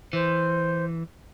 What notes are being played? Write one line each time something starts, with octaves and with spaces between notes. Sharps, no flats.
E3 C5